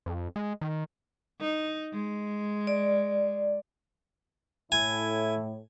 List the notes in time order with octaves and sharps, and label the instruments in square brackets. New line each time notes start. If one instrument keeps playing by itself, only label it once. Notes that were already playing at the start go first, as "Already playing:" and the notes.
[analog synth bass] F2
G#3
D#3
[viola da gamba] D#4
G#3
[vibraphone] D5
[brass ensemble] A2 [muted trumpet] E4 [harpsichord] G#5